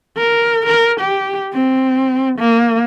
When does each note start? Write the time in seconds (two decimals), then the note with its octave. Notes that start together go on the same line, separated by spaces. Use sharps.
0.18 A#4
0.66 A#4
1.01 G4
1.54 C4
2.39 A#3